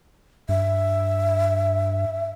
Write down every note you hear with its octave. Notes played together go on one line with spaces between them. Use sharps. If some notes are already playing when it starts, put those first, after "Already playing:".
G2 E5